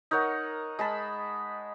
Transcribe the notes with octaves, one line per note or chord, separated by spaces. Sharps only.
D#4 A#4 C#5 F#5
G#3 A5 B5